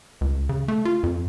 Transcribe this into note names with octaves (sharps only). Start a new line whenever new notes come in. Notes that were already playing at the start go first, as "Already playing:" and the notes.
C#2
C#3
A3
F4
F2